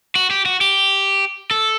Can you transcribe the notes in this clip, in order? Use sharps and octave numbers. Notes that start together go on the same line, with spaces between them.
F#4
G4
F#4
G4
A4